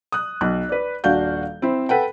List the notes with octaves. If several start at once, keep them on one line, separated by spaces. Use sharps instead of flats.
D#6 F#6
B1 F#6
B4 D5
D#1 D4 F#4 F5 G6
C4 E4 C5
A4 B4 F#5 G5